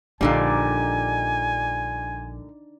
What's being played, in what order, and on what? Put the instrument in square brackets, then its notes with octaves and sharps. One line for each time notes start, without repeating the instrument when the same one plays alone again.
[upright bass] A#1 [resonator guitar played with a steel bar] A#2 D3 G3 [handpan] D4 D#4 D5 [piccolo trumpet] G#5